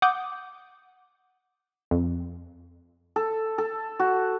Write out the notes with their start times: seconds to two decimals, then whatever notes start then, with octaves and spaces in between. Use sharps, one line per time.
0.02 F#5 D6 D#6 G6
1.91 F2
3.16 A4
3.58 A4
3.99 F#4